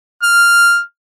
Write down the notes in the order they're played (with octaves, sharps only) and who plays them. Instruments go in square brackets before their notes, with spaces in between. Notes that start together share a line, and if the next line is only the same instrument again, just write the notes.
[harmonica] F6